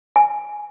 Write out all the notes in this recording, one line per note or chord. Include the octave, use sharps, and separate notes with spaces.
G#5